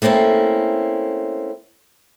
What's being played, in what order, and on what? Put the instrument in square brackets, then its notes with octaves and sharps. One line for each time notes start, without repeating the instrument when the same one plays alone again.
[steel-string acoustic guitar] A3 A#3 C4 C#4 E4